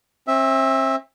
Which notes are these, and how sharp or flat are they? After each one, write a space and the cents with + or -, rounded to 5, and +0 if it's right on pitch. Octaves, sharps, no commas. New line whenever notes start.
C4 +40 E5 -10